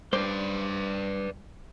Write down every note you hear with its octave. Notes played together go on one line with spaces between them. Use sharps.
G2 B4 C5 D5